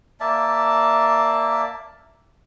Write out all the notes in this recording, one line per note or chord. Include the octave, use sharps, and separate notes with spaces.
A#3 D5 E5 A5